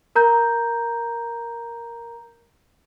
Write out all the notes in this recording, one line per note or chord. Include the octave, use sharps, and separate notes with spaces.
A#4 A#5 G6